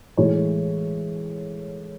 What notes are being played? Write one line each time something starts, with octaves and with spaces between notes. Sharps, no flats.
A2 E3 G#3 C#5